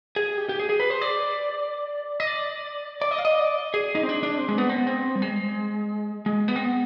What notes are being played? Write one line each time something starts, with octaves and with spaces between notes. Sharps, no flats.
G#4
G4
G4
G#4
G#4
B4
C5
D5
D#5
D5
D5
D#5
F5
D#5
D5
G#4
D#4
C4
D4
D4
C4
G#3
B3
C4
B3
C4
G3
G#3
G#3
B3
C4
B3